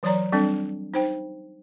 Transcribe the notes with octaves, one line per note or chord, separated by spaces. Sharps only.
E3 F#3 C#5 D5 A#5
G3 C4 D4 A4
D#4 C5 G5